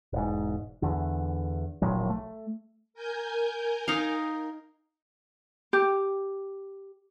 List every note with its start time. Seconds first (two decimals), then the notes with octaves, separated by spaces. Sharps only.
0.13 E1 G#2
0.82 E2 D3
1.82 D#1 A#1 A2 F#3
2.10 A3
2.94 A#4 G#5 G6
3.88 D#4 F5
5.73 G4